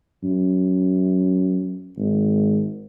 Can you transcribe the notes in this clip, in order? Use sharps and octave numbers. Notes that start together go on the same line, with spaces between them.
F#2
G#1